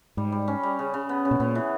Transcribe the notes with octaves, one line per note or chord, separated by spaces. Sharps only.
G#2 G3
G3
C#4
G3
C#3
C#3
B3
C#3
B2
A#2 B3
E3